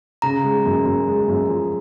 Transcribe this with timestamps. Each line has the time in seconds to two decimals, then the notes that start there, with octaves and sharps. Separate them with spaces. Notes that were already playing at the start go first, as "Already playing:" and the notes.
0.22 C#3 A#5
0.44 G#3
0.65 F#2
0.85 F#2
1.07 G#3
1.28 F#2
1.49 F3